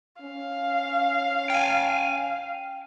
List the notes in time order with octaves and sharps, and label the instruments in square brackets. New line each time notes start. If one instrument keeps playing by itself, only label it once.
[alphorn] C#4 [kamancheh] F5
[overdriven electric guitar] G5 G#5